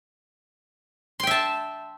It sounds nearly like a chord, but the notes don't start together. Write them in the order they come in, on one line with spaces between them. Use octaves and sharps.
C6 G5 E5 A5